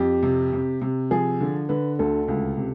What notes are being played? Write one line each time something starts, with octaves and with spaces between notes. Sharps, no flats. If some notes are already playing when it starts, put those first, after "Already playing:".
Already playing: F2 G4
C3
C3
C3
F3 G#4
D3
D3 B4
D2 A4
C#2
C3